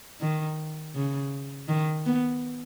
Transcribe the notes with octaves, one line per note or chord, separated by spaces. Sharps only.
D#3
C#3
D#3
B3